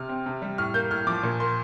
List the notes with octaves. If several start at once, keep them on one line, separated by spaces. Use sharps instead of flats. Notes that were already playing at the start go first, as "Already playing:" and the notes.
Already playing: C3 F6
C4
C3
G3
A2 F6
A#3 G6
A2 F6
F3 D6
A#2
A#3 C6